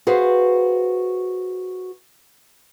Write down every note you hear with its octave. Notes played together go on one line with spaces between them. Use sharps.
F#4 G#4 B4 C5 F5